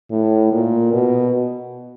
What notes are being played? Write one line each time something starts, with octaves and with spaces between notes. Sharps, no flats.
A2
A#2
B2